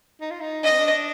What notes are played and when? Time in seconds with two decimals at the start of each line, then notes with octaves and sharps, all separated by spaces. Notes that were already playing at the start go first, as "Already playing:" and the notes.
0.21 D#4
0.31 F4
0.41 D#4
0.64 D4 D#5
0.71 C4
0.79 D4